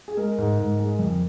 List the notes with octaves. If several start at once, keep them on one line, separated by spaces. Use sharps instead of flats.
G#4
G#3 A#4
G#2
G#2
G#3
F2